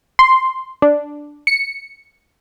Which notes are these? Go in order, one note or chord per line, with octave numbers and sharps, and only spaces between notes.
C6
D4
C#7